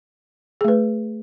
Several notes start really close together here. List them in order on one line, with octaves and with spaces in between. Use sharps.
G#4 A3 B4